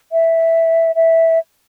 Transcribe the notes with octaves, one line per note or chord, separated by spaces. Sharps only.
E5
E5